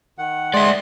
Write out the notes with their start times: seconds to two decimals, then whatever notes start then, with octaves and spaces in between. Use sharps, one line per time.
0.18 D#3 F#5
0.54 G#3 D5 E5 C6